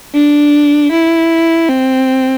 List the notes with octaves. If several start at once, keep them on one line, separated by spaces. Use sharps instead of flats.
D4
E4
C4